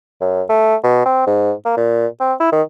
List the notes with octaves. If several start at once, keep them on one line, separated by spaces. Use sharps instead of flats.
F#2
A3
B2
C4
G#2
A#3
A#2
C4
E4
D#3